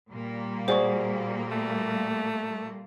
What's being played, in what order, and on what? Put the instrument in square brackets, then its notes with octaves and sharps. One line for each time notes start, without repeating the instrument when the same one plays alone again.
[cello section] A#2 G3 A#3
[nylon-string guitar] F#4 G#4 [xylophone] C5 D5 C#6
[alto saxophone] A3